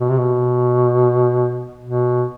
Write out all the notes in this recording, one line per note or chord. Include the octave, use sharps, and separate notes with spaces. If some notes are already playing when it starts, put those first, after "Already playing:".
B2
C3
B2
B2